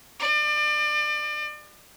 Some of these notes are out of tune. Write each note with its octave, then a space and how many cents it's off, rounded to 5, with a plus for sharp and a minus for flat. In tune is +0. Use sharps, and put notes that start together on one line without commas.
D5 +35